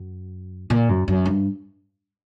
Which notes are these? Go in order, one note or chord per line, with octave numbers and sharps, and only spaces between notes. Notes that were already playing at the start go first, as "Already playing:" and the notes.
Already playing: F#2
A#2
F#2
F#2
G2